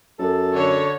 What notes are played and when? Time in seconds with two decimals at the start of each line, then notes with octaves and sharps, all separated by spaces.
0.19 F#2 A4
0.55 D3 C#5